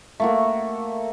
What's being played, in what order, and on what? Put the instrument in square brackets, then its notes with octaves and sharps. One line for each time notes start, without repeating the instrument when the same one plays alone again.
[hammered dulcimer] A3 A#3 F#4